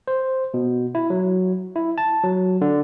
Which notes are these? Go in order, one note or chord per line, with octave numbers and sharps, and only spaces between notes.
C5
B2
E4
F#3
E4
A5
F#3
D3